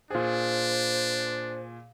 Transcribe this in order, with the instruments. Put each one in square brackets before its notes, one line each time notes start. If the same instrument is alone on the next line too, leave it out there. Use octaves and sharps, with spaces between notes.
[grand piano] A#2 G#4 [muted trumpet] D4 [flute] C5